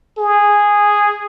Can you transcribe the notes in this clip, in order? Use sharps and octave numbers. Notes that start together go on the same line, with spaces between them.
G#4